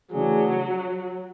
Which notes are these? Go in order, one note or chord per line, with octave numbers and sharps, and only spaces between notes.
C#3 E3 F#3 A3 D4 G#4